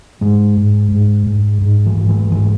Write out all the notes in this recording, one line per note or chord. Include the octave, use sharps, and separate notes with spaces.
G#2 G#3
G#2
G#2
G#2
G#2
E3
G#2
E3
G#2 E3